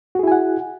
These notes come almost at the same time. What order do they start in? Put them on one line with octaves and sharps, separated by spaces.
F#4 G#4 E4 G#5 F#5